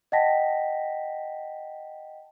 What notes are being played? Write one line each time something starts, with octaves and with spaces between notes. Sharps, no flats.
D#5 F#5 G5 A5 A#6 B6